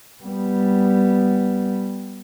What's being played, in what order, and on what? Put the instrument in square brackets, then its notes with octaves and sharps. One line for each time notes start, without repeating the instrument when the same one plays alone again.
[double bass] G3 B3